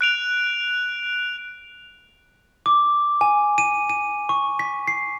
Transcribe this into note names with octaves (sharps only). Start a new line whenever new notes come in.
F#6 D7 F7
D6
G#5
D#7
D#7
C#6
B6
C7